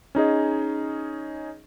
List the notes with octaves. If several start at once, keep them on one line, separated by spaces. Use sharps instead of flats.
C#4 D#4 G#4 D#5